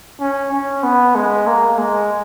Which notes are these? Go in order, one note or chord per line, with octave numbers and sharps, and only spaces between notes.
C#4
C#4
B3
G#3
A#3
G#3